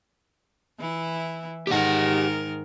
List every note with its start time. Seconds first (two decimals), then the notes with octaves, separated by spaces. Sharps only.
0.79 E3 E4
1.67 G#2 D#3 G4 A#4 F#5